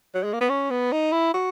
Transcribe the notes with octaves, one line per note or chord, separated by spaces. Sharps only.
F#3
G#3
A#3
B3
C#4
B3
D#4
E4
F#4